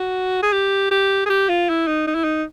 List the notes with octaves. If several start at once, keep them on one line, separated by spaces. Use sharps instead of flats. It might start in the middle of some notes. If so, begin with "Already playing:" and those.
Already playing: F#4
G#4
G4
G4
G#4
G4
F4
E4
D#4
D#4
E4
D#4